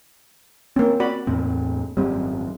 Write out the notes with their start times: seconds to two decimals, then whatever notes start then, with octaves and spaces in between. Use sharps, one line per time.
0.76 A#3 C4 C#4
1.00 F#4 D5 B5
1.27 E2 A2 C4
1.97 G#1 F#2 G3 C4